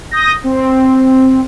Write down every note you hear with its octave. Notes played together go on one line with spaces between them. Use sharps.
D#6 G6 A#6
C4